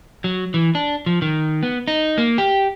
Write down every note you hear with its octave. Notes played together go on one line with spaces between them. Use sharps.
F#3
E3
D4
F3
D#3
B3
D#4
A#3
G4